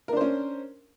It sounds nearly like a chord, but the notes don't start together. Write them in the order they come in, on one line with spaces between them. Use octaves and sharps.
A#4 D4 C5 C#4